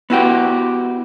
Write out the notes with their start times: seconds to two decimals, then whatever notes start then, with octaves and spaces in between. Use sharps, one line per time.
0.10 B3 E4 F#4 G4